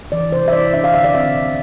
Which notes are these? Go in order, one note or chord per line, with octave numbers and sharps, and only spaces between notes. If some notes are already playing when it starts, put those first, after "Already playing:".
E3 D5
C3 C5
E5
E4 D5
D4 E5
F5
D3 E5
D5
C4 E5
B2